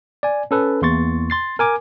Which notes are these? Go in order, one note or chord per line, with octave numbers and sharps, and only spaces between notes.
D5 G#5
C#4 A4 B4
E2 A#3 C6 C#6 A6
C6 A6 C7
A#4 G#5 D6